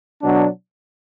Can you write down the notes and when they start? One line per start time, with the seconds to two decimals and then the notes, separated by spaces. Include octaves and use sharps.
0.22 B2 F#3 D4